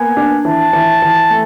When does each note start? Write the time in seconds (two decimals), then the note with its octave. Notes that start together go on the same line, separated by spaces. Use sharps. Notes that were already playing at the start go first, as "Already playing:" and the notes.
Already playing: A#3 B3 G#5
0.17 D4
0.45 E3 A5
0.73 E3
1.02 E3
1.30 A3